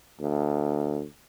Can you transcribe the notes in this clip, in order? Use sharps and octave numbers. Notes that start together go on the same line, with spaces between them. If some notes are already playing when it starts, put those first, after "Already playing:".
D2